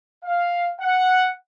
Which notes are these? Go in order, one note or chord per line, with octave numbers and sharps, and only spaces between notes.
F5
F#5